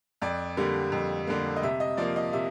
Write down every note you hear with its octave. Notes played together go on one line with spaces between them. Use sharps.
F2 D5
D3 G3 A#3
F2
D3 G3 A#3
D#5
C3 E5
D#5
F3 A#3 D5
D#5
C3 E5